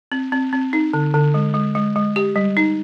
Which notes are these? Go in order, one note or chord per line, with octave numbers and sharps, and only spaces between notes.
C4
C4
C4
D#4
D3
D3
G#3
G#3
G#3
G#3
G4
G3
D#4